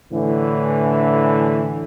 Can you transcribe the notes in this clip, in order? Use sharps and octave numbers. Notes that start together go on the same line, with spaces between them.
A2 D3 E3